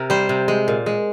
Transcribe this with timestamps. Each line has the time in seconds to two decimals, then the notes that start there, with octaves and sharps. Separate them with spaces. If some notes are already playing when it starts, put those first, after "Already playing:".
Already playing: C3 A#4
0.10 G3 C5
0.29 C3
0.48 G#3
0.68 A#2
0.86 G#3